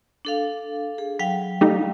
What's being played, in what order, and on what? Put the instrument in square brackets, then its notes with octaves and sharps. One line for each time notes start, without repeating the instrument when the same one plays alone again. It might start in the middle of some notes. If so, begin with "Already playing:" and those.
[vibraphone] D4 A4 F5
G#4
F#3 F5 G5
[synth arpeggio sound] G3 A3 D#4